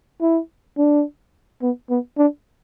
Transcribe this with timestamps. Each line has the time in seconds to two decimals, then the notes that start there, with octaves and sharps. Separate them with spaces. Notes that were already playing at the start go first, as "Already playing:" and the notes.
0.21 E4
0.78 D4
1.62 B3
1.90 B3
2.18 D4